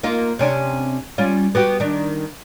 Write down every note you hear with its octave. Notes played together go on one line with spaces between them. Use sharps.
A#3 D#4 F4
C3 C#4 D4
G3 C#4 F4
B3 F#4 G4
D#3 D4